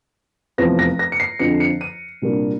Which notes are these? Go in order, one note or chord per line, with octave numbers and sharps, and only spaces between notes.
F1 E2 C3 F3 A#6
A#6
A#6
C#7
C7
F2 D3 F3 C#7
C#7
D#7
C2 A#2 G3 A#3 D4